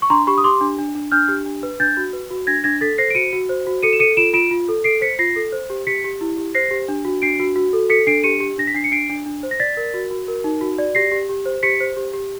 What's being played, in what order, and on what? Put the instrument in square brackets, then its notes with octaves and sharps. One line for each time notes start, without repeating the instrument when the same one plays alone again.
[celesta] C#6
D4 A#5 C6
G4 B5 C#6
D#6
G4 C6 D6
D4
D4
D4
D4 F6 G6
G4
D4
B4
D4 G6 A6
F#4
B4
F#4
D4 G#6 A#6
D4 G#6 A#6
A4 A6 B6
C5 A#6 C7
D7
F#4 C#7 D#7
F#4
C5
F#4
A4 C#7 D#7
E7
A4 C#7 D#7
F4 D7 E7
F4 D7 E7
F4
A4
A4 C7 D7
C5 B6 C#7
F4 A#6 C7
A4
C5
G4
G4 B6 C#7
G4
E4
G4
C5 A#6 C7
G4
D4
F#4
D4 C7 D7
F#4
F#4
A4
A4 B6 C#7
D4 C7 D7
G4 C#7 D#7
G4
D4 A#6
B6
D4 C7
C#7
D4 C7 D7
D4
D4
C5
A#6
D5 A6 B6
A#4
F#4
F#4
A#4
D#4
F#4
D5
G4 A#6 C7
G4
G4
C5
G4 B6 C#7
C5
G4
G4